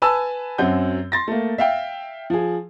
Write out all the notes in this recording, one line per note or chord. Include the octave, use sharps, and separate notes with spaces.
B4 G#5 A5 E6
F#2 F#3 C4 F#5 G6
C6 A6 A#6
A3 A#3
E5 F5 G5
F3 G#4